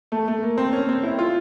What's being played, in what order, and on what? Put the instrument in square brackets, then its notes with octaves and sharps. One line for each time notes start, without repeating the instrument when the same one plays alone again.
[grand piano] A3
A3
A#3
C4
C#4
C4
E4
F4